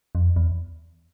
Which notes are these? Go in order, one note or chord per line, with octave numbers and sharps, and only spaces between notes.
F2
E2